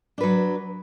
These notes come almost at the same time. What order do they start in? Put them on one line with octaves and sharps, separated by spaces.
D4 B4 F#3